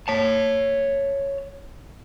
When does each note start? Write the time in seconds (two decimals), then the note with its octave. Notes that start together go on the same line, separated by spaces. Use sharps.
0.08 C#5 A5